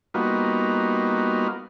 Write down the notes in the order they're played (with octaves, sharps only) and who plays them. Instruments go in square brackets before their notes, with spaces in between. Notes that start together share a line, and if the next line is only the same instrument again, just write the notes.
[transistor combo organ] G3 A#3 B3 D#4 F4 F#4